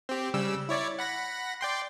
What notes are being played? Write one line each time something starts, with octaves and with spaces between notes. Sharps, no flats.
C4 G4
C#3 G3 E6
E4 C#5 D5
F#5 B5 A#6
D5 G5 C6